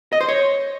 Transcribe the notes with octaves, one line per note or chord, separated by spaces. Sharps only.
D#5
C5
C#5